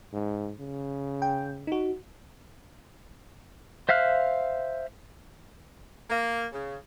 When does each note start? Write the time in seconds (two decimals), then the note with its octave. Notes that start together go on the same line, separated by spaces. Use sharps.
0.13 G#2
0.60 C#3
1.22 G5
1.67 D#4 F#4
3.89 C5 E5 F5 F6 F#6
6.10 A#3
6.53 C#3